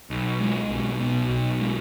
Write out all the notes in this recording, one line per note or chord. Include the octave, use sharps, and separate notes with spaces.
B1
G#3
B1
B2
B1
G#3